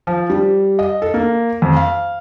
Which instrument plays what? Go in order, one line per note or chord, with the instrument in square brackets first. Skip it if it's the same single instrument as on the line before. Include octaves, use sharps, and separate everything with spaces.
[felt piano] F3
G3
D#5
A4
A#3
F2
F5